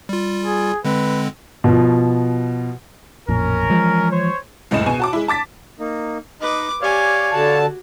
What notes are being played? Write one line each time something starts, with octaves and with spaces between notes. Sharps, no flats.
G3 F4
G#4
D3 G#3 C4 B4
B2 F3
A1 F2 A#2 C#4 A#4
E3 F3 G#3
C5 C#5
F#1 C#2 A2 D#5 E7
B2 G#5
F#4 A5 D6
G#3 E4
A5 D6 A6 B6
A#3 D#4
D#4 B4 D#5 D6
G4 C#5 D5 F5 G#5
D3 F#4 A5